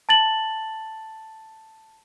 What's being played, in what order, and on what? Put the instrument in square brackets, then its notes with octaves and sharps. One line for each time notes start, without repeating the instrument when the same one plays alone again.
[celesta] A5 A6 F#7